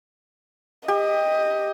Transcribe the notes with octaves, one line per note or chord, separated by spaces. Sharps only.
G4 D#5